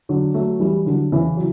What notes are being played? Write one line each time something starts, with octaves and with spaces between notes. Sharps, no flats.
D3 F#3
F#3 A3
E3 G3
D3 F#3
C#3 E3
F#3